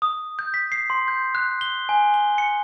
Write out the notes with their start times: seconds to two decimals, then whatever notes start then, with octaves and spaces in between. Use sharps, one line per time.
0.02 D#6
0.39 G6
0.54 B6
0.72 C7
0.90 C6
1.08 G6
1.35 F#6
1.61 G7
1.89 G#5
2.14 G7
2.38 C#7